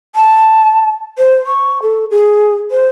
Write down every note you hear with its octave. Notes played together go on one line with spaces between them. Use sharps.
A5
C5
C#6
A4
G#4
C5